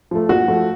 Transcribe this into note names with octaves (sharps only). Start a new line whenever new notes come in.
F3 A3
A#2 F#4
F3 A3